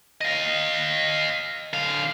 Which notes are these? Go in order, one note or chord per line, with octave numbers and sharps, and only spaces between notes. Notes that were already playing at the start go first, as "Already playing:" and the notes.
D#5 F5
D3 F5